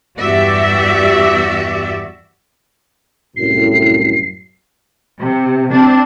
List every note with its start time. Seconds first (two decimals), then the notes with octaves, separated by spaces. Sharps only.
0.19 E2 G2 F#4 G4 D5 E5
3.37 C2 F#2 A2 C7
5.20 C3
5.71 C4 D4